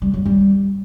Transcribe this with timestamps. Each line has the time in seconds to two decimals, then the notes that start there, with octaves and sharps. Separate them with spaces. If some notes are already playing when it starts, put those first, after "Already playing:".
0.02 G3
0.14 F#3
0.26 G3